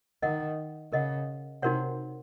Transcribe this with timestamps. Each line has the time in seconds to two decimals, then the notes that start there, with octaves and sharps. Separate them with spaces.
0.22 D#3 A#4 D#5 F#5
0.92 C#3 A#4 D#5 F#5
1.62 C3 D#4 F#4 A#4 C#5 F#5